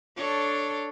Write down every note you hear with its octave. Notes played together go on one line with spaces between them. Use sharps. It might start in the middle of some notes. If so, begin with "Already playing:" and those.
D4 A4 C#5